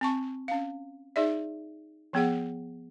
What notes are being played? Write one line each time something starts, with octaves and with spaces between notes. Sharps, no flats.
C4 A5 C#6
C#4 F5
D#4 G#4 D5 E5
F3 B3 G#4 F#5